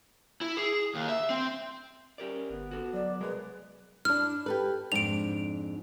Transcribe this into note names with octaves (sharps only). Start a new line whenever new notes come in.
E4
G#4
D#2
E5
C4
C#4 G4 A#4 D5
G1 B3
F#4 A4
F#3 D5
C2 G#3 G#4 A#4 B4
D4 E4 F6
G4 A4 B4
F2 G#2 D4 D7 F7